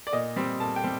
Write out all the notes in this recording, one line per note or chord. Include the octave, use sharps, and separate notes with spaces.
D5
A#2 D#5
G3 C4
A#2 A5
G5
G3 C4